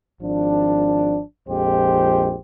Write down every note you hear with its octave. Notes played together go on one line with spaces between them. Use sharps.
G#1 F3 D4
A#1 F2 G#3 G4 C5